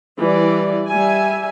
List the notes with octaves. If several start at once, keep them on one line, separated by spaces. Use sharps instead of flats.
E3 G3 D5
G3 E5 G#5